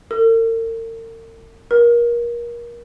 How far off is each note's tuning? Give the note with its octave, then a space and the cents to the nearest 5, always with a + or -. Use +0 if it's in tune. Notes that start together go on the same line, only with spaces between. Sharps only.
A#4 -45
A#4 +25